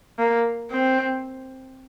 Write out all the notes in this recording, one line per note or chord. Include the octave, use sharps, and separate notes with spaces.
A#3
C4